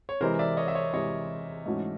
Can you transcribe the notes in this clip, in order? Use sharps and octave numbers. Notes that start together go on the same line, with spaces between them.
C#5
C3 E3 G#3 A#4 C5
D5 E5
C#5 D#5
E5
C#5 D#5
C3 E3 G#3 C#5 D#5
G#2 E3 A3 C#4 F#4